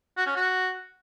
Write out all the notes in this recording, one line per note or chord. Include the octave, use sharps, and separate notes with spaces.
F#4
C#4
F#4